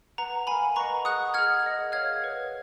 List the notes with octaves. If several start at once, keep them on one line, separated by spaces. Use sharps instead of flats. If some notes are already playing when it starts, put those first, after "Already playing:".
B4 F#5 A#5
A#4 F5 G#5 B5
B4 D#5 F#5 A#5 C#6
G#4 D#5 F#5 D#6 F#6
G#4 D#5 F#5 F6 G#6
A#4 D#5 F#5
G#4 C#5 F5 F6 G#6
B4 F#5